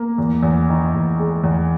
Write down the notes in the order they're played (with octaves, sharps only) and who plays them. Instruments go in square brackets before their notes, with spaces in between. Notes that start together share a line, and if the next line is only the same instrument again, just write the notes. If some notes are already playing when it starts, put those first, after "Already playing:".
Already playing: [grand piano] A#3
E2
E2
D#3
E2
G#3
E2